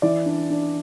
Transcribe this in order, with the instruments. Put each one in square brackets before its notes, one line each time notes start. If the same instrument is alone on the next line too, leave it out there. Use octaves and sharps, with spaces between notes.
[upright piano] E3 D5
D4
D4